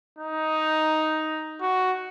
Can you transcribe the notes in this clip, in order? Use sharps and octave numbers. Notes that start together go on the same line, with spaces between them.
D#4
F#4